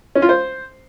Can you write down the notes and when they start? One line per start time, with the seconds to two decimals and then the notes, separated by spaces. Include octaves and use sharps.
0.15 C#4
0.22 F4
0.29 C5